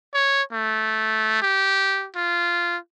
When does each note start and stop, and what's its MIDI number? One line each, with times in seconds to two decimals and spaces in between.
0.14 0.42 73
0.53 1.42 57
1.42 2.08 67
2.16 2.78 65